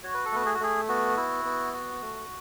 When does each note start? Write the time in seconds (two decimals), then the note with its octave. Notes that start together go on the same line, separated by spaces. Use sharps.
0.03 F#4 C#5
0.14 B4
0.25 A4
0.32 A3 B3 B4
0.46 G#4
0.54 F#4
0.60 A3 G#4
0.88 B3 F#4
1.17 E4
1.45 B3
1.73 F#4
2.01 A3